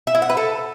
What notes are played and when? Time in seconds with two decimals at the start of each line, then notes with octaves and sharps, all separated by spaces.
0.07 E5
0.15 E4
0.22 F#5
0.29 B4
0.37 A4